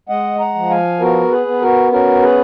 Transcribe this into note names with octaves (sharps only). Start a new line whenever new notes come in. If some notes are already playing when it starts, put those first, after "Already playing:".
G#3 D#5 F#5
F#5 A#5
F3
F5 G#5
B3 F#4 A#4
G#4 B4
B3
F#4 A#4
C#4 F#4 A#4
G#4 B4